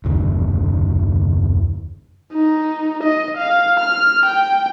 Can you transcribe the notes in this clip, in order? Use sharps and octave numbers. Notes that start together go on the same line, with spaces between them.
F#1 D#2 D3
D#4
D#5
F5
F6
G5